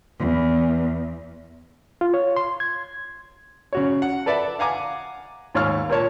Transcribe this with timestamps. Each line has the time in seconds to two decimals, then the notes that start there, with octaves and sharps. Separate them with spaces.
0.19 E2
2.01 F4
2.14 C#5
2.36 C6
2.60 G#6
3.73 C#3 F#4 C#5
4.02 F#5
4.26 A4 B4 D5 E5 A5
4.59 F5 F#5 G#5 A#5 D6
5.55 D#2 G#2 C#5 F5 C#6 F6
5.89 A#2 A#3 C#5 A5